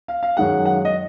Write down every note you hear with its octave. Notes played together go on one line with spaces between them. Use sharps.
F5
F5
F#2 D#3 G#3 F#5
F#5
D#5